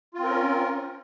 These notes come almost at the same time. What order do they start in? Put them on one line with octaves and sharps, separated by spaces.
F4 C4 A#4 C#4